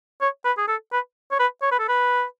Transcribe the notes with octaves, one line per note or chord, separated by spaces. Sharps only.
C#5
B4
G#4
A4
B4
C#5
B4
C#5
B4
A4
B4